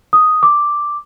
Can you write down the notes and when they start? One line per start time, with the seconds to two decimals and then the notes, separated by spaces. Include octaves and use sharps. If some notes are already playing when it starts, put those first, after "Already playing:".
0.13 D#6
0.43 D6